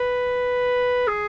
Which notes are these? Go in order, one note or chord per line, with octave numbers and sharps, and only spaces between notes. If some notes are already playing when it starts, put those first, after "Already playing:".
Already playing: B4
G#4